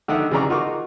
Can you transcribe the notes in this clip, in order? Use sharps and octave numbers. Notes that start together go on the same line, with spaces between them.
D3 D#3 E5 F#5
C#3 E3 D5 A#5 C#6
D#4 F4 F#4 A#4 C#6 D6